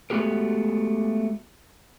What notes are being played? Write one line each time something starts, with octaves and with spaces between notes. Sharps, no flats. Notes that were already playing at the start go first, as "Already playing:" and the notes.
G#3 A3 B3 F#4 G4 A#4